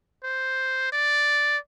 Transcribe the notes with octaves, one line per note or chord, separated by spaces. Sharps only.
C5
D5